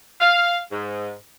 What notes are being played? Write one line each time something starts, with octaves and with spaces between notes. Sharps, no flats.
F5
G#2